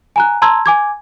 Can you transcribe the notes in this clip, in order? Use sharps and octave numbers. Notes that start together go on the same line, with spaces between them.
G#5 A#5 F#6
A5 A#5 C6 E6 G#6
G#5 D6 G#6